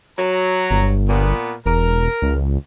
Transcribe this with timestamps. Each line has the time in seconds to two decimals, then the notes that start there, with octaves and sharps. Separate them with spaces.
0.19 F#3 A#5
0.70 G1
1.09 A#2 B3
1.66 E1 A#4
2.22 C#2